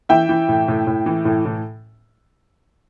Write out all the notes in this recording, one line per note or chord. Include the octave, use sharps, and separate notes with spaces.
E3 E5 G5
E3
A2
A2
A2
E3
A2
A2